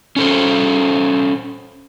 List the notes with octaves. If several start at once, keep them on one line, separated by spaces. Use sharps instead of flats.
C#4 A4 C5